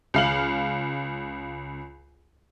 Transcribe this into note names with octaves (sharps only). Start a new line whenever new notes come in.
C#2 F5 F#7